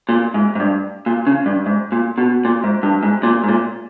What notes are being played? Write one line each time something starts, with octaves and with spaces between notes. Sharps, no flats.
A#2
G#2
G#2
G2
A#2
C#3
G2
G#2
A#2
B2
A#2
G#2
G2
G#2
A#2
G#2
A#2